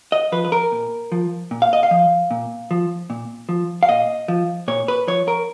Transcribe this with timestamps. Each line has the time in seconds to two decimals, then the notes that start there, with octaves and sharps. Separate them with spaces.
0.12 D#5
0.32 F3 B4
0.45 B4
0.52 A#4
0.72 A#2
1.12 F3
1.51 A#2
1.62 F5
1.73 D#5
1.83 F5
1.91 F3
2.31 A#2
2.71 F3
3.10 A#2
3.49 F3
3.83 F5
3.89 A#2 D#5
4.28 F3
4.68 A#2 C#5
4.88 B4
5.07 F3 C#5
5.28 A#4